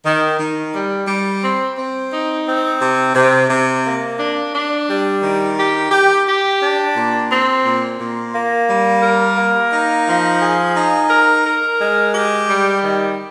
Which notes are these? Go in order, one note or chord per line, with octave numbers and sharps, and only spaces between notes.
D#3
D#3
G3
G3
C4
C4
D#4
C4
C3
C3
C3
A#3
D4
D4
G3
D#3
G4
G4
G4
D4
A#2
C4
A#2
A#2
A#3
G3
A#4
A#3
D#4
F3
G#4
D#4
A#4
A#4
G#3
G4
G3
D#3